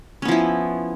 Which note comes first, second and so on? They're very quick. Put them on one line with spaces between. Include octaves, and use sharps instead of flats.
C#4 B3 F3 E4